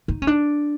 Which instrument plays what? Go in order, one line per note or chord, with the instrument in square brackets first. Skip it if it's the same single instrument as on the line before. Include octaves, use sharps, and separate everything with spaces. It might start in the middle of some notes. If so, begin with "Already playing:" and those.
[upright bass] D#4
C#4
D4